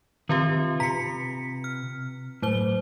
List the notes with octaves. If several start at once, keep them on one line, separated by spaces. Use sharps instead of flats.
D#3 C4 F4 G4 B4 E5
C3 B4 A#5 B6 C#7
F6
A2 F#3 C5 G7